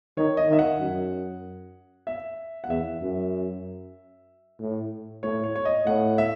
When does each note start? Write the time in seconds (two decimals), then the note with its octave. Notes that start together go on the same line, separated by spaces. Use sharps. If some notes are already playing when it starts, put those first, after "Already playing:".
0.17 D#3 C#5
0.37 D#5
0.49 D#3 E5
0.59 F#5
0.80 F#2
2.07 E5
2.64 F#5
2.69 E2 E5
3.02 F#2
4.60 A2
5.23 A2 C#5
5.44 C#5
5.56 C#5
5.65 D#5
5.86 A2 F#5
6.18 E5